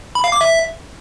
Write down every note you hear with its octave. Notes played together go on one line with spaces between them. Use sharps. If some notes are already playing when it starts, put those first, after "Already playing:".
B5
F5
D6
E5